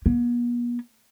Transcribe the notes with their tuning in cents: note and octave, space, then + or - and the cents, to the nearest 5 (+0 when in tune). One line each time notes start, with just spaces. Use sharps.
B3 -45